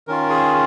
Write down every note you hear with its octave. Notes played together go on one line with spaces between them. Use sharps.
D#3 C#4 F4 A#4
G#4